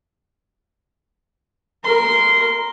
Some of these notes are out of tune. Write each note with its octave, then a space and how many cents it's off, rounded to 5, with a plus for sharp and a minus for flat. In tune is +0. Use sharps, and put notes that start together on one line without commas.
A#4 +0 C6 -15